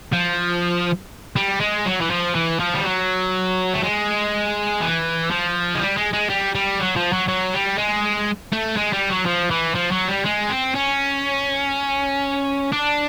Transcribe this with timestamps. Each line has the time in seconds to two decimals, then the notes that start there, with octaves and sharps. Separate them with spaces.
0.13 F3
1.36 G3
1.60 G#3
1.85 F#3
2.01 E3
2.10 F3
2.34 E3
2.59 F3
2.74 G3
2.83 F#3
3.74 A3
3.83 G#3
4.81 E3
5.30 F3
5.75 G#3
5.81 G3
5.97 G#3
6.13 G#3
6.30 G3
6.55 G3
6.80 F#3
6.96 F3
7.13 F#3
7.28 F#3
7.54 G3
7.78 G#3
8.52 A3
8.76 G#3
8.93 G3
9.09 F#3
9.26 F3
9.51 E3
9.75 F3
9.92 F#3
10.08 G3
10.25 G#3
10.49 C4
10.75 C#4
12.72 D4